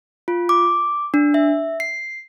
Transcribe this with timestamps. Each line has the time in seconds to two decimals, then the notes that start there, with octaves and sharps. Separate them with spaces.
0.28 F4
0.49 D6
1.14 D4
1.34 E5
1.80 C7